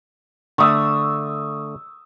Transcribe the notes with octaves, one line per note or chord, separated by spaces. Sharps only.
D3 A3 C#6 D#6 E6